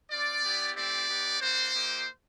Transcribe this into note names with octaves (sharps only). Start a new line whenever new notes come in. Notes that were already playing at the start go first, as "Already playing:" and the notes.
C4 F4 D5
B3 E4 G4
A3 C4 E4 G4 D5
B3 D#4 G4
A#3 D4 F#4 C5
A#3 D#4 G4